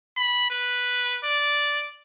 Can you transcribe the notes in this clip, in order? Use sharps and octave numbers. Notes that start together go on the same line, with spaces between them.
B5
B4
D5